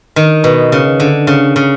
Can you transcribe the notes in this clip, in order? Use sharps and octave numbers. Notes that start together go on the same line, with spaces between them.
D#3
B2
C#3
D3
C#3
C#3